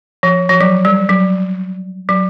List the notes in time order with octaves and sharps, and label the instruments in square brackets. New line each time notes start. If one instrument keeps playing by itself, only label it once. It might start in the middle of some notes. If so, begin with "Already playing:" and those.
[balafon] F3
F3
F#3
G3
F#3
F#3